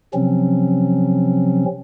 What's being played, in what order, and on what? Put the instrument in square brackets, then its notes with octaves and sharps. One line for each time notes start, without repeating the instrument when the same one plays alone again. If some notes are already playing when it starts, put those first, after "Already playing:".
[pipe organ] C3 F3 F#3 C4 C#4